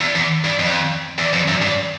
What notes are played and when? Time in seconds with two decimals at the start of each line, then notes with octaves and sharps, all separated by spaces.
0.01 E2
0.15 E2
0.44 G2
0.59 F2
1.18 E2
1.33 F2
1.48 F#2
1.62 G2